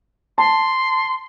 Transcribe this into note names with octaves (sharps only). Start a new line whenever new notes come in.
A5 C6